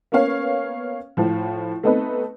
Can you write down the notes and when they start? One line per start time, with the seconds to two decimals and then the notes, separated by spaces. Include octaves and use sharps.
0.12 A#3 B3 C#4 C#5 F5
1.17 A2 F3
1.83 A3 B3 C4 D#4 A4 B4